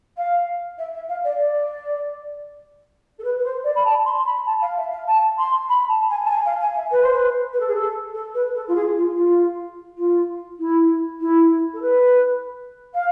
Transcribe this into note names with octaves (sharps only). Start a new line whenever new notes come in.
F5
E5
E5
F5
D5
D5
A4
B4
B4
C5
D5
B5
A5
C6
B5
A5
F5
E5
F5
A5
C6
B5
A5
G#5
A5
G#5
F5
G#5
E5
B4
C5
B4
B4
A4
G#4
A4
A4
B4
A4
F4
G#4
F4
F4
F4
E4
E4
A4
B4
F5